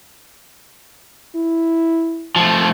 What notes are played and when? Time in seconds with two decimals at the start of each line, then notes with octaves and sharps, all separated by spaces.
1.36 E4
2.36 F3 A3